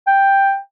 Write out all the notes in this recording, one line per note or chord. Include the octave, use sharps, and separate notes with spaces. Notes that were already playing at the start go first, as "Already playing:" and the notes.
G5